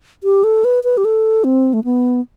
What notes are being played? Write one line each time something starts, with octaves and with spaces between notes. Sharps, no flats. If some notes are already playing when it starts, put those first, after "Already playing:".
G4
A4
B4
B4
G4
A4
C4
A3
B3